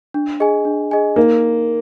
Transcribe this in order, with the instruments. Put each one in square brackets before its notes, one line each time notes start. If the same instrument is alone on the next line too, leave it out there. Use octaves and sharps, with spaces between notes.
[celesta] D4
G#4 D#5 G#5
D4
G#4 D#5 G#5
[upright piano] A#3 [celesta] D#4